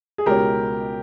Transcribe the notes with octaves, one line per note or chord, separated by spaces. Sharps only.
G#4
C#2 B2 G#3 C#4 G4 A#4